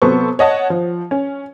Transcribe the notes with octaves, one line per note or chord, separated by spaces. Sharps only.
C3 F#3 B3 A4 C5 C#6
C#5 D#5 F#5 A5
F3
C#4